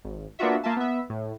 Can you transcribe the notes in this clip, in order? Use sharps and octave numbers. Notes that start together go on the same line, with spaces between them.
G#1
A#3 B3 D4 F4 F#4 E5
A#3 F4 E5 A5
B3 E5
A2